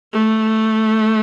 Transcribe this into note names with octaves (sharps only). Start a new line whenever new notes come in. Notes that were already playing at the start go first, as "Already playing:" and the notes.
A3